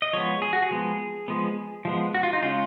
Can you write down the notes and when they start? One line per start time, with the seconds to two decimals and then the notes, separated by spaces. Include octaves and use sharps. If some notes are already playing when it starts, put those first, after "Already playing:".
0.02 D#5
0.13 F3 G#3 B3 C#5
0.42 G#4
0.53 F#4
0.62 G#4
0.71 F3 G#3 B3
1.28 F3 G#3 B3
1.85 F3 G#3 B3
2.14 F#4
2.23 F4
2.33 D#4
2.43 C#3 G#3 C#4 F4